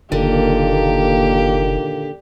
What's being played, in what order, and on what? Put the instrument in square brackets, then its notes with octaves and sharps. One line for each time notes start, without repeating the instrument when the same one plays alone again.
[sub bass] F#1 [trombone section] A#2 D#3 A#3 [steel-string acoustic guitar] D3 [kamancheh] G4